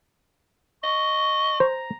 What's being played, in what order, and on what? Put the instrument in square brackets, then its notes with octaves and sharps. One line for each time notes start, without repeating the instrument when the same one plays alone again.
[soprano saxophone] D#5 [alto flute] C#6
[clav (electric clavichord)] C5 [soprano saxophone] A#5